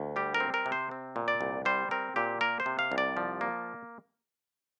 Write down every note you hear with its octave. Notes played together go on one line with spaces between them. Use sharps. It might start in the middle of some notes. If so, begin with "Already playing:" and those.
Already playing: D2
G3 G4
A#4
C4
A#4
C3
C5
C4
A#2
D5
C2
G3 C5
C4 A#4
A#2 G4
A#3 A#4
C5
C3
F5
C2
D5
F3
A#3